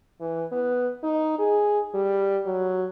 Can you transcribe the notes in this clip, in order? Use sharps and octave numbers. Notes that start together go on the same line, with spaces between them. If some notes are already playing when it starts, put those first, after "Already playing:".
E3
B3
D#4
G#4
G3
F#3